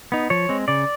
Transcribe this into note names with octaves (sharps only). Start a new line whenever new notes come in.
B3 D#4
F3 C#5
G#3 C4
C#3 D5